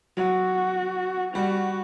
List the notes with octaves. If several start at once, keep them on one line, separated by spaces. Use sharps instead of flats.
F#3 F#4
G3 F#4